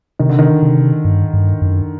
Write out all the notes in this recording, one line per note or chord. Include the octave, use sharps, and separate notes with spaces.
C3 D#3
D3
D#3
C3
G2
G2
F#2